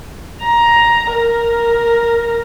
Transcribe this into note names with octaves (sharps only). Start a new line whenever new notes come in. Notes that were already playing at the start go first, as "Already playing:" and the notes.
A#5
A#4